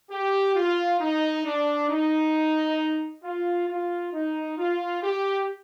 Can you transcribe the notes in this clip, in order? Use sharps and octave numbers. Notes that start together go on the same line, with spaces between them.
G4
F4
D#4
D4
D#4
F4
F4
D#4
F4
G4